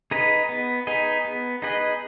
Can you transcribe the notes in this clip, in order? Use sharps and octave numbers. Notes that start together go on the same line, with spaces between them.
D#4 G#4 B4 D#5
B3
D#4 G#4 B4 D#5
B3
D#4 G#4 B4 D#5